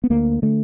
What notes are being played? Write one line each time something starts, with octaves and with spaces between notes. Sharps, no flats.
B3
D2 A#3
D3 A3